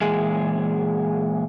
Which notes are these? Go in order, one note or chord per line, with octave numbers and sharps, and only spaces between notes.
A#2 E3 G#3 G#4